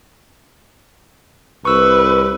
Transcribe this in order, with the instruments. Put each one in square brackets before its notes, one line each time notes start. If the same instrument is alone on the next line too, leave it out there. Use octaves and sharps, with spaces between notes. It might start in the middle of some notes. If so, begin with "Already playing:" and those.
[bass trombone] C2 [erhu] B4 [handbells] C#6 E6